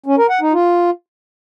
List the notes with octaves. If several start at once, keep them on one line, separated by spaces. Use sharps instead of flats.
C#4
A#4
F#5
D#4
F4